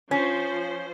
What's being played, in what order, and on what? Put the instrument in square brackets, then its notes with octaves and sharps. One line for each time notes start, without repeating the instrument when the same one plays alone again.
[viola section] F3 C5 [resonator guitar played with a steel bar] C#4